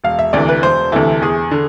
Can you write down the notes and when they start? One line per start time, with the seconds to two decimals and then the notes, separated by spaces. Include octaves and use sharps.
0.04 E1 F5
0.19 E5
0.33 D2 C3 E3 D5
0.48 B4
0.63 E1 C5
0.92 D2 C3 E3 A4
1.22 E2 G#4
1.51 D3